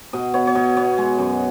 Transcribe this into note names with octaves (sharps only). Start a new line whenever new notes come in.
B2 D#5
B3 C#5
C#5
B2 D#5
B3 C#5
G#3
F#2